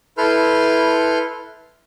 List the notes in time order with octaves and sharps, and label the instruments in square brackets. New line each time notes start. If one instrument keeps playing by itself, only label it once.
[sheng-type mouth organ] E4 A4 B4 C6 F6 G6